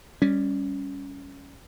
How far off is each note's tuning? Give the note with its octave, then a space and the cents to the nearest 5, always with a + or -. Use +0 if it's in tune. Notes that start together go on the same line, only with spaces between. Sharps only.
G3 +15 C#4 +0